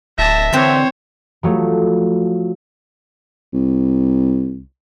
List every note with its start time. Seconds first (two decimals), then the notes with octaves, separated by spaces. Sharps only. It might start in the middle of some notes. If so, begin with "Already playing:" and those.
0.19 D1 E5 A5 A#6
0.53 D3 E3 C4 C5 C#5 A#5
1.43 F3 F#3 A3
3.54 C2